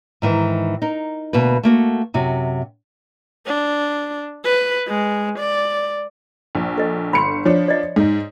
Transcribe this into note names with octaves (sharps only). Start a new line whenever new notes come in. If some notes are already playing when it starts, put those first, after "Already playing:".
G#2 D#3 E3
D#4 A#4
D2 B2 A#3 B4
A3 A#3 F#4
F#2 C3 F#4
D4
B4
G#3
D5
A#1
A4 D#5
G1 B5 C6 C#7
F3 D4 C#5
D5 D#5
G#2 D#4